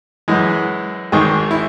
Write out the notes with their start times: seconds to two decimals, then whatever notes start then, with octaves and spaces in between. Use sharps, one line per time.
0.28 F#2 E3 G#3
1.12 G#1 G#2 D#3 G#4
1.51 E4